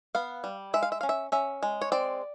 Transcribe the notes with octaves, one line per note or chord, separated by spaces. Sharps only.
B3 F5
G3
G#3 E5
F5
E5
C#4 F5
E5
C#4 E5
G#3
C#5
C4 D5